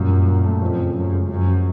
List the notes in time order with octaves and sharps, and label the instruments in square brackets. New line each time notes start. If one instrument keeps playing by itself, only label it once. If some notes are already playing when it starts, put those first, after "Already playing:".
Already playing: [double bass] F#2 [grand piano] A#2 G3
[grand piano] A#2
A#2
A3
[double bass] F2 [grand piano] F3
[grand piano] C#3
[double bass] F#2 [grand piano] C#3
[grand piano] G#3
[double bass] F#2 [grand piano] F3
[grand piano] F3